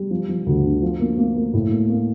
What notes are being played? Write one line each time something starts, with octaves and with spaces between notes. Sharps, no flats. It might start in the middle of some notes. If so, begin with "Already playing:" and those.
Already playing: G3
F3
F3
D2
D3
F3
A#3
A#3
A#3
A2
A#3
A#3